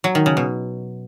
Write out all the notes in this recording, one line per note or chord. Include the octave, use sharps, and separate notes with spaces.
F#3
D#3
C#3
B2